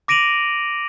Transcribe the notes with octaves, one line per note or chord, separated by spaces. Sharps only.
D6 A#6 D7 D#7 F7 F#7